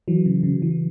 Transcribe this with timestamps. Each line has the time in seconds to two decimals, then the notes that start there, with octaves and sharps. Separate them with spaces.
0.08 E3 F#3
0.26 C#3
0.43 C#3
0.62 E3